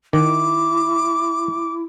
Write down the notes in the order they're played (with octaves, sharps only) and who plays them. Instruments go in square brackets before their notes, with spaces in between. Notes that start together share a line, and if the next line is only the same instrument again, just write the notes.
[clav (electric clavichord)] D#3 [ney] E4 [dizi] D6